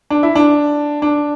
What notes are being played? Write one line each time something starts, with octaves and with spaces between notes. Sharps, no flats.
D4
E4
D4
D4